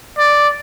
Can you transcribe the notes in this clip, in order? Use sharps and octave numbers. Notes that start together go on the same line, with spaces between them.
D5